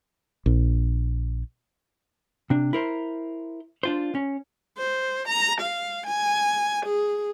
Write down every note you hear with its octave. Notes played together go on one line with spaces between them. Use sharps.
A#1
C3 D4
E4 A#4 C5
D4 F4 C5
C#4
C5
A#5
F5
G#5
G#4